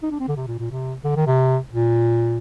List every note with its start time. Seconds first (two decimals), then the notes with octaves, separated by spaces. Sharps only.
0.03 D#4
0.11 D4
0.20 C4
0.28 D3
0.36 C3
0.47 A#2
0.59 A#2
0.71 C3
1.04 D3
1.16 D#3
1.27 C3
1.72 A#2